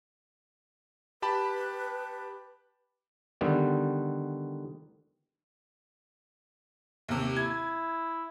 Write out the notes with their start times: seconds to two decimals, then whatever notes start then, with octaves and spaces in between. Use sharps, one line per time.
1.22 G4 B4 A5 B5
3.41 D3 D#3 G3 B3
7.08 D#2 C3
7.36 E4 G#6